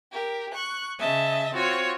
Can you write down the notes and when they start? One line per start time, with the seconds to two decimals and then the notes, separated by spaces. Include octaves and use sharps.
0.12 G4 A#4
0.54 C#6 F#6
1.00 C#3 D#5 E5 A5
1.54 C4 F4 F#4 C#5